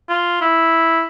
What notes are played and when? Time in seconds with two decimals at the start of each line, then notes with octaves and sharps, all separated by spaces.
0.09 F4
0.41 E4